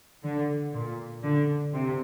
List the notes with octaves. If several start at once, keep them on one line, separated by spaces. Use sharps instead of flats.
D3
A#2
D3
C3